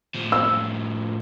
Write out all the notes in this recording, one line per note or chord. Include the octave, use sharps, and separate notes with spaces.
A2 F3
E6